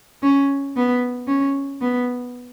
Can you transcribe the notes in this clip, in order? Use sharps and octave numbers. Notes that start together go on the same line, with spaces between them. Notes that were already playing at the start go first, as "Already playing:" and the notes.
C#4
B3
C#4
B3